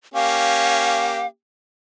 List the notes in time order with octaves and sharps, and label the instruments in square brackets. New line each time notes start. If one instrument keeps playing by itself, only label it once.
[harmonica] A#3 C#4 G4 [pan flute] F5